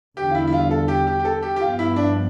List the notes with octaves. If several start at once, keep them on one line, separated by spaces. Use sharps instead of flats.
E2 D3 G3 G4
F4
E4
E4
F4
A4
G4
G4
G4
A4
G4
G4
G2 F3 B3 F4
E4
D4